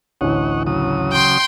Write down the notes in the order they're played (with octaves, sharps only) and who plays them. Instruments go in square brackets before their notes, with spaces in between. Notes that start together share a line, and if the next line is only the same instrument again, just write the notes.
[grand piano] A1 D2 E3 [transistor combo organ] C#5 D#5 F#5
[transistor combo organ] C#3 F#3 D#6
[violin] G5 C6